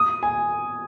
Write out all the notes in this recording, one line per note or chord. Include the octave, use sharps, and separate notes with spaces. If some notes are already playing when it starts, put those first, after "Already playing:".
Already playing: D#6
G#5